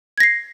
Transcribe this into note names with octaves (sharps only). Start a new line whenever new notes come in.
G#6 A#6 C7